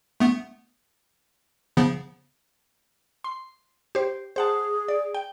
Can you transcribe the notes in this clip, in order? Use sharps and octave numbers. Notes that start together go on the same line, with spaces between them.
A3 B3
C#3 F3 B3
C6
G4 C5
G#4 C5 F#5 A5
D5
G5